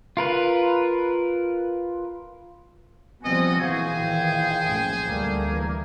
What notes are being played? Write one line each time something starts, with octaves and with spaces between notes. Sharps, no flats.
F4 A#4 B4
F3 G3 B3 C4 F#4 A4 D#5 G#5
A#2 E3 F#4 G#4 C5 F5 G#5
A#2 D#3 E3 G5
A#1 F#2 A2
D2 G3 A3 A#3
E3